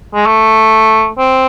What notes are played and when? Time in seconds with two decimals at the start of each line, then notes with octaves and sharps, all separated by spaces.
0.14 G#3
0.26 A3
1.18 C4